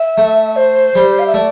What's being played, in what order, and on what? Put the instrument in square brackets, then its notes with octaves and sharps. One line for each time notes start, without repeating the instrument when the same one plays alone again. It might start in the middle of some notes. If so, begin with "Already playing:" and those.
Already playing: [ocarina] E5
[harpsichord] A3
[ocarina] C5
[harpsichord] G3
[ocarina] F5
E5
[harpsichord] A3 [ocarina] D5